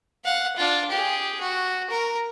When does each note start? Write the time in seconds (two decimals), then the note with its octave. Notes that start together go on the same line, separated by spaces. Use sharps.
0.24 F5 F#5
0.56 D4 F4
0.90 G4 G#4
1.41 F#4
1.90 A#4